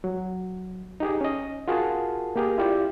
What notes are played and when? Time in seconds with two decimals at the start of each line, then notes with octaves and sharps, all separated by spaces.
0.04 F#3
1.00 D#4 G4 G#4
1.21 C#4 D#5
1.68 F4 F#4 G#4 A#4 A5
2.36 A#3 G4 G#4 A#4
2.58 E4 F4 G4 D5